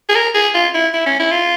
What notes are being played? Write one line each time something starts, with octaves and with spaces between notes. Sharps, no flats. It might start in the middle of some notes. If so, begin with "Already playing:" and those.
G#4
A#4
G#4
F4
E4
E4
C#4
E4
F4